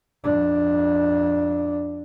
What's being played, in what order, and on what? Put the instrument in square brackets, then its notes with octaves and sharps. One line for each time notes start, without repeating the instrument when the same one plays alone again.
[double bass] F2 D4